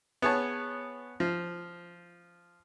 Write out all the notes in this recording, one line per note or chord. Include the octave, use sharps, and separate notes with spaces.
B3 G#4 C#5 A5
F3